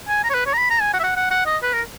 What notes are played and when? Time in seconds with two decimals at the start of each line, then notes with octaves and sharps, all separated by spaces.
0.09 G#5
0.24 A#5
0.30 C#5
0.34 B4
0.46 C#5
0.53 A#5
0.58 B5
0.70 A#5
0.81 G#5
0.93 F#5
1.00 E5
1.04 F#5
1.16 F#5
1.31 F#5
1.46 D#5
1.63 B4
1.73 A#4